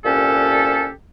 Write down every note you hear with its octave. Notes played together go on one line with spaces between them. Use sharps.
C2 A#2 C#4 G4 A4